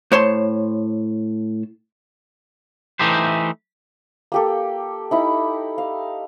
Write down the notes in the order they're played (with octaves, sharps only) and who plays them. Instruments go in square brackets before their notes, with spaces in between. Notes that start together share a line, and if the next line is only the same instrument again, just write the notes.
[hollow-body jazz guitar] A2 C5 C#5 A5 C6
[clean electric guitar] E3 A3 D#4 G4 C5
[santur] A#3 G4 A4
D#4 E4 B5
F5